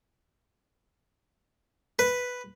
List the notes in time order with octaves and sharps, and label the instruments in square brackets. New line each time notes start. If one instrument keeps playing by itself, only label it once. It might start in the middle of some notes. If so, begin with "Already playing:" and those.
[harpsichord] B4